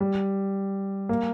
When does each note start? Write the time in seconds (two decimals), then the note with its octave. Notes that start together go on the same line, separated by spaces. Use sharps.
0.01 G3
1.09 A#3